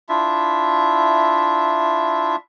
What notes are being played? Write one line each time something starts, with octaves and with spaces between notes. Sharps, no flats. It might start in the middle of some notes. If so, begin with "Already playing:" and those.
D4 E4 F4 E5